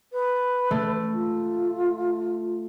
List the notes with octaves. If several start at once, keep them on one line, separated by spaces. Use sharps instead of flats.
B4
A3
F4